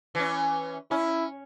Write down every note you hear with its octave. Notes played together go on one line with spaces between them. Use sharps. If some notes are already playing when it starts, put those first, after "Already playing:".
E3 C#4
C#4 E4